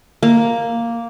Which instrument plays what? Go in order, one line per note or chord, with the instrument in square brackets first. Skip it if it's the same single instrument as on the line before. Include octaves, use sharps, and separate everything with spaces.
[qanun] A#3